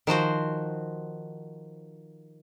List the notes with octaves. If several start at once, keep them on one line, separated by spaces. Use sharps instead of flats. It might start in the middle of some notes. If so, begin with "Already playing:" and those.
D#3 F3 F#4 C5